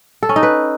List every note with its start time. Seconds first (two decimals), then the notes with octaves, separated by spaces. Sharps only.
0.23 A4
0.29 C#4
0.36 D#4
0.43 B4